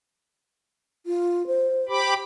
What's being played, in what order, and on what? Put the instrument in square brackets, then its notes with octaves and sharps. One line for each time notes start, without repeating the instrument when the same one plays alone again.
[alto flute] F4
C5
[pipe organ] G4 B5 D6